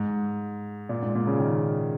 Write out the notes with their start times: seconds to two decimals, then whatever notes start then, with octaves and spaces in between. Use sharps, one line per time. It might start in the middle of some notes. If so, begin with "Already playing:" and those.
Already playing: G#2
0.89 A#2
1.02 G#2
1.15 A#2
1.27 C#3
1.40 D#3